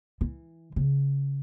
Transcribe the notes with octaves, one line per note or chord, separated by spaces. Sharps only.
E3
C#3